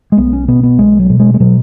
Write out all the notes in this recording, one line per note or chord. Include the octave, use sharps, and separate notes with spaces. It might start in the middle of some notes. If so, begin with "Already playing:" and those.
G#3
B1 B3
C#4
B2 B3
B3
B1 G#3
F#3
B2
G#3
G#3
B2 F#3